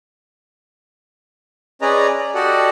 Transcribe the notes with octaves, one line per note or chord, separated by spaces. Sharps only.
C#4 G#4 B4 D5 D#5 A#5
D5
F#4 G4 A4 D5 D#5 F#5